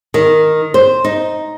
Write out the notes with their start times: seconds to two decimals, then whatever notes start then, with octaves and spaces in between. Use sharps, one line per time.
0.14 D#3
0.74 C5
1.04 D#4